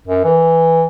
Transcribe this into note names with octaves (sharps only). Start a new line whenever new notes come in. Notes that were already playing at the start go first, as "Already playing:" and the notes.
F#2
E3